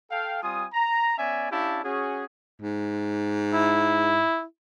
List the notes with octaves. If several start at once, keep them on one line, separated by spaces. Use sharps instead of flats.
A4 F5 G5
G3 C4 F4 G#5 D#6
A#5
B3 C#4 D5 E5 G#5
C#4 D4 E4 G4 F5 A5
C#4 F#4 G#4
G#2
E4